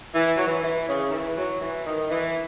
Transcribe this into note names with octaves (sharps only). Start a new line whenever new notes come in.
E3
F#3
E3
E3
C#3
D#3
E3
F#3
E3
D#3
E3